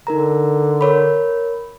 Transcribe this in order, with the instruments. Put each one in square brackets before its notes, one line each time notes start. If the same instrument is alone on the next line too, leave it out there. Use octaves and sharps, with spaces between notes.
[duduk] D3 [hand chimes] D#4 A#4 A#5
[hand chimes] A#4 C#5 B5